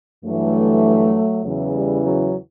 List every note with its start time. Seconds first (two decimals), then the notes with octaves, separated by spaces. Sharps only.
0.24 G2 E3 F#3 A3
1.43 E2 C#3 E3 F#3
1.74 G3
2.03 F#3